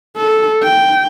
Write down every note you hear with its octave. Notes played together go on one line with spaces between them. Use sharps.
A4
G5